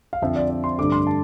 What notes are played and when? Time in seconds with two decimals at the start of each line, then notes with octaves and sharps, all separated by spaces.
0.13 F5
0.22 F2 D3 F3 C4 E5
0.36 D5
0.50 D5
0.64 C6
0.79 G2 D3 A3 D6
0.92 C6
1.07 A5